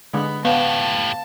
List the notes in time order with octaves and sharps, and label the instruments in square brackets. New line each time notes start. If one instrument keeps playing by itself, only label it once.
[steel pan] D3 G#3 [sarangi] B3
[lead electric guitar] A2 G4 [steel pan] B3 [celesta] F5 [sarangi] A5